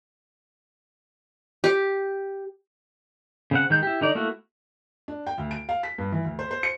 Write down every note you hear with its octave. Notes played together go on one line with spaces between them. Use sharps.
G4
C#3 C4 F#5
D#3 G#3 G6
E4 G4
D3 D#4 D5
A3 A#3 E4 F#4
D4
G5
D2
D7
F5
B6
G2
E3
D2
C5
C5
C#7